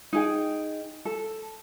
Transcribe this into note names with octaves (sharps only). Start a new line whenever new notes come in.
D#4 G#4 G5
A4